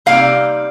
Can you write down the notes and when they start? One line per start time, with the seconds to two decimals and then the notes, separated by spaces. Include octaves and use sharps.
0.06 C3 G3 A#3 D#4 F5